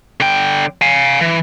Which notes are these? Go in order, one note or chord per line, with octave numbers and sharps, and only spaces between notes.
D3 G5
F5 G#5
E3